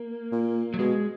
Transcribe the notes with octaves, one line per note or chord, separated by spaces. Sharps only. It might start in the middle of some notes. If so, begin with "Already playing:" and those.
Already playing: A#3
A#2
F#3
B2 G#3